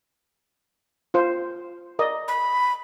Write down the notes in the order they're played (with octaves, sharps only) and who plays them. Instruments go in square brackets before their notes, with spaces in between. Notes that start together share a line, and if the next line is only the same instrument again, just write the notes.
[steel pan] F4 C5
A#4 D5 D#5
[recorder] B5